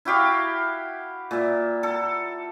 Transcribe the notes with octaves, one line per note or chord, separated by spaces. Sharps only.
E4 F#4 G4 F5
A#2 E5
A4